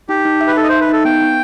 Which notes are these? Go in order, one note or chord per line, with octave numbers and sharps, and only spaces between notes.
D#4 G4
D#4
E5
B4
D#4 A4
D#5
C5 E5
B4
D#4 A4
B3 G5
B3